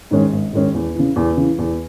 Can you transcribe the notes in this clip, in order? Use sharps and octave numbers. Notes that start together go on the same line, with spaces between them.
G#2 D#3 G#3 C#4
G#1
G#2 D#3 G#3 C#4
E2
C#3 E3
E2
C#3 E3
E2